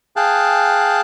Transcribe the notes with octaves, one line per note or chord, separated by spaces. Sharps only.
G#4 F5 G5 A5 F#6